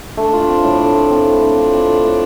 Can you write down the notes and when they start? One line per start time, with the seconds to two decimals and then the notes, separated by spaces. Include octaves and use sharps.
0.17 A3 D4
0.33 F4
0.48 C4
0.64 A2
0.79 A3
0.95 F4
1.11 C4
1.26 A2
1.42 A3 D4
1.57 F4
1.73 C4
1.88 A2
2.04 A3